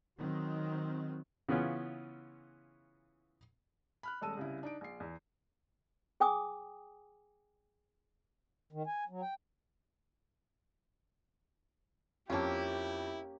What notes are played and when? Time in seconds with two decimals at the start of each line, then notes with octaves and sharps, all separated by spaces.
0.18 D#3 F#3 C4
1.49 C#3 E3 B3 C#4 F4
4.03 B5 F6 F#6
4.21 D#1 G#3 A4 A5 E6 D#7
4.37 C2 C#3 E4
4.63 D4 D#4 D7
4.81 A#1 C7
5.00 E2
6.20 G#4 G5 G#5 D6 D#6
8.72 D#3
8.87 G#5
9.09 F#3
9.22 G5
12.30 F2 A#3 C#4 E4 G4 C#5 A5